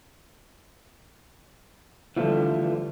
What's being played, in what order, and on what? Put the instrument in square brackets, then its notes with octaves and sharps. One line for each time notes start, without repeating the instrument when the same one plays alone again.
[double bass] D3 G3 [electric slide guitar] E3 F3 A3